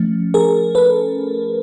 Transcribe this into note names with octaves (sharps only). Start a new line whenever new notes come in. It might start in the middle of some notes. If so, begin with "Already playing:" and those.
Already playing: F3 A3 C#4
G#4 A#4
A4 B4